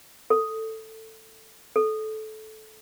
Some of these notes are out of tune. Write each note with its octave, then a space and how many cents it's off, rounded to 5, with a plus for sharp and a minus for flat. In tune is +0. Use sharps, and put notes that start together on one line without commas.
A4 +10
A4 -20